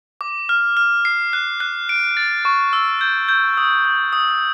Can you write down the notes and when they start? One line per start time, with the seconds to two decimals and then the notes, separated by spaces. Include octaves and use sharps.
0.21 D6
0.49 F6
0.77 F6
1.05 C7
1.33 F#6
1.60 F#6
1.89 D7
2.17 A6
2.45 C#6
2.73 E6
3.01 G6
3.29 G6
3.57 D#6
3.85 D#6
4.13 D#6